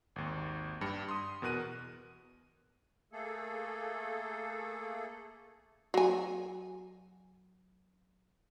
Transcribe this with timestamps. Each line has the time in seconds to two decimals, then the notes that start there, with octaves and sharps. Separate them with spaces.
0.16 G#1 D#2
0.81 G2 G4 C#7
1.09 C6 D#6
1.42 E2 B2 A#4 F#6 D#7
3.13 A3 A#3 G#4 A4
5.94 F#3 G#5